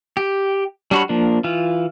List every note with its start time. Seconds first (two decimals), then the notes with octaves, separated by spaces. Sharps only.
0.17 G4
0.91 G3 D4 F#4 C#5 B5
1.09 F3 A#3 D4
1.44 E3 F4